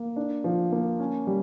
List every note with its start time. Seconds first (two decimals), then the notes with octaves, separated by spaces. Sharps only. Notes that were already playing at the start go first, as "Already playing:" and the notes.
Already playing: A#3
0.16 D4
0.44 F3
0.72 A#3
1.00 C#4
1.27 G3